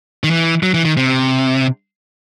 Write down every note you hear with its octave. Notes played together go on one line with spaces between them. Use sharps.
D#3
E3
F#3
E3
D#3
C3